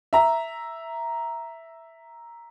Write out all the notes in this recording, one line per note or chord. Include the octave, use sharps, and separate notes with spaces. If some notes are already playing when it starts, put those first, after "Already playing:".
E5 A#5